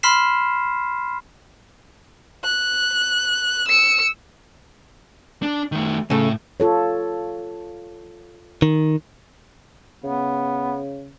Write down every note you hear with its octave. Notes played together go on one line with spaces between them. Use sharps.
B5 C6 F6 B6 C7 E7
F#6
E6 C#7
D4
D#3 A3
A2 C#3 A3
F4 A4 C#5
D#3
C#3 B3